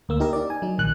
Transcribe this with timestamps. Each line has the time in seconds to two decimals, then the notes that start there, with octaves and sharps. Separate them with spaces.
0.09 D2 A#3 E6
0.20 D#4 G4 A#4 D#5
0.33 D#4 D5
0.50 G#5
0.62 F#3 D#4
0.78 A#1 D#3 F#6